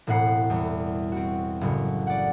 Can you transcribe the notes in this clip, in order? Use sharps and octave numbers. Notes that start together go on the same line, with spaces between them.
E1 A2 C4 F#5 C7
E2 G3
C4 F#4
F#1 A2 F#4
D5 F#5